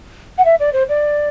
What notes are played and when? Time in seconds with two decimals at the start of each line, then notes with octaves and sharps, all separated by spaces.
0.38 F#5
0.45 E5
0.59 D5
0.73 C5
0.89 D5